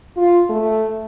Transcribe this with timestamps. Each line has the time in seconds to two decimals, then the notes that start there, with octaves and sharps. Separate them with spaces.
0.17 F4
0.50 A3